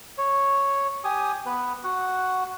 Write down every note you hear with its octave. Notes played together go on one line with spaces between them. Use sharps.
C#5
G4 G#5 D#6
B3 B4
F#4 F#5